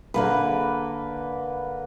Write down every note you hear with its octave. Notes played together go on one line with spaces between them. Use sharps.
D3 A#3 B4